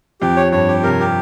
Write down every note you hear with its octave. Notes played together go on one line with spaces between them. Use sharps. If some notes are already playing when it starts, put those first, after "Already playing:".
F2 G4
C#5
G2 C#5
G4
C3 A#4
G4